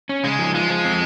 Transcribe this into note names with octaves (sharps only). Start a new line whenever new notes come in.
C#4
C#3 G#3
F3
G#3 F4
F3
C4